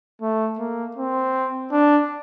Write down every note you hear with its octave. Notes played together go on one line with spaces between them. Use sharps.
A3
A#3
C4
D4